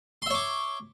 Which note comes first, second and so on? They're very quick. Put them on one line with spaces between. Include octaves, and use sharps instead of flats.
C6 E5 C#5 D6